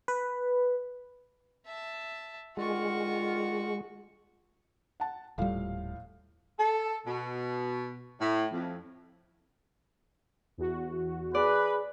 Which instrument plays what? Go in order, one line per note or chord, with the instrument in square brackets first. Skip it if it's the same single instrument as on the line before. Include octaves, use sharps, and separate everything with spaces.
[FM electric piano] B4
[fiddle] E5 A5
[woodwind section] D3 D#3 F4 [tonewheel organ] G#3 [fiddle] F#4 C#6
[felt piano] F#5 A5
[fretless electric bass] D#1 G3 [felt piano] A2 F3 F5
[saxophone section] A4
B2
A2
F2
[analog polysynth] E2 F#4
[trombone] G#4 [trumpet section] B4 [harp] D5